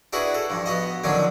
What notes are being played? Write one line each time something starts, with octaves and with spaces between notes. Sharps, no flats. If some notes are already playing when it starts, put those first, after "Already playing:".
D4 E4 F#4 G#4 B4
A4
G2 F3
B3 F#4 D#5
D3 D#3 F3 F#3 C#4 D4